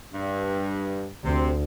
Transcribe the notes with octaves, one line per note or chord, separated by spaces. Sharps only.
G2
D2 C3 C4